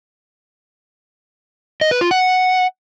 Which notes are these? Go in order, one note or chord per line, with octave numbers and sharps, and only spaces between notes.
D#5
B4
F4
F#5